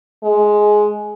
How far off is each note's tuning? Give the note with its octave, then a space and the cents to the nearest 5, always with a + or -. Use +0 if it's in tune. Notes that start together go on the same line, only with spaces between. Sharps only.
G#3 +10